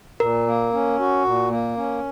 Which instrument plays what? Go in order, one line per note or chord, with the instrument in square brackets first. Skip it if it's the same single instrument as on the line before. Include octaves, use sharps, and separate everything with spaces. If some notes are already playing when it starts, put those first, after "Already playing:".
[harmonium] A#2 [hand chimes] A#4
[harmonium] A#3
C#4
F#4
A#2
A#3
C#4